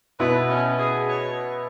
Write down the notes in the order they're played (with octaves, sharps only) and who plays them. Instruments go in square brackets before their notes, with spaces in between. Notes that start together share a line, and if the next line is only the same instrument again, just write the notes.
[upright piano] B2 B3 E4 [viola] B4
[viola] C#4
G#4
C#5